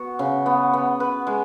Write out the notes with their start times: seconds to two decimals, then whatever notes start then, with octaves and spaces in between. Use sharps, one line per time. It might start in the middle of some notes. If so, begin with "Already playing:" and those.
Already playing: B3 F#4
0.19 C#3
0.46 B3
0.73 B3
1.00 B4
1.27 G#3